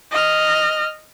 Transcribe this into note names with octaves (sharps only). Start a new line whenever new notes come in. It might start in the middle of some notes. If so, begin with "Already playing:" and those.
D#5 F6